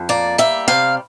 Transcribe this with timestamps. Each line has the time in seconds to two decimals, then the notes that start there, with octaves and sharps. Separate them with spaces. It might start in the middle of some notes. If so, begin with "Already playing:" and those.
Already playing: F2
0.09 A#3 D5
0.38 G3 E5
0.68 C3 F5